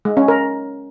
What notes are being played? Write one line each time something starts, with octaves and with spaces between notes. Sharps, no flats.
G#3
C#4
A#4